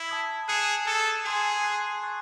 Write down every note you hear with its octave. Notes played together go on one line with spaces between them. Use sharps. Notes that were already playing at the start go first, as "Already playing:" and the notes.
Already playing: E4
A5 D#6 G#6
G#4 F#6 C#7 E7
A4 A5 D#6 G#6
G#4 G#5 C6 D#6
C6 F#6 C7
C#6 F#6 A6